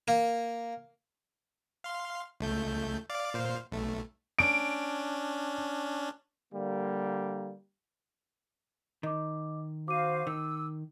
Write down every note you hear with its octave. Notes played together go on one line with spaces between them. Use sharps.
A#3
F5 C6
C#2 A3 G6
D5 F5 D6
A#2 C5 F5
B1 A3
C#4 D4 D7
D3 G3 A#3
D#3 D#5 D6
F#4 C5 F5 D6 D#7
D#3 E6